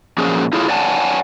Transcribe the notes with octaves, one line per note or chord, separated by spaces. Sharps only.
A#2 F3 F#3 C#4 G#4
E4 F4 G#4 A4 C#5
C#5 D5 F#5 G#5 A5